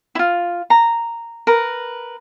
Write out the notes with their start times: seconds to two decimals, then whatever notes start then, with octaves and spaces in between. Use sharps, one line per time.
0.15 E4 F4
0.70 A#5
1.47 A#4 B4